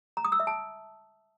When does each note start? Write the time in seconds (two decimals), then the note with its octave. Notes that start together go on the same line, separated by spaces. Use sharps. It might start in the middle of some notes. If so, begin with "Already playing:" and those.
0.17 A#5
0.25 D#6
0.32 E6
0.40 E5
0.47 A5